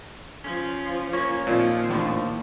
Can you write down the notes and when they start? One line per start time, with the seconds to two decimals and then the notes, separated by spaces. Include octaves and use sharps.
0.44 F3 C#4
1.13 A#3 C#4 C#5
1.47 D#2 A#2 F3 C4
1.89 D#2 A2 D3 E3 A#3